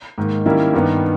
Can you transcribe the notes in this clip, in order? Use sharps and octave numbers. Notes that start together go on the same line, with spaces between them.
G#2 D#3 A#3
D#3 G3 A#3 C#4 E4
G2 D#3 G3 B3 D#4